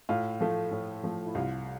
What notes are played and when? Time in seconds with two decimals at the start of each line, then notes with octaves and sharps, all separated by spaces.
0.09 A2 F4
0.41 F3 A3
0.71 A2
1.03 F3 A3
1.27 E4
1.35 C2 F4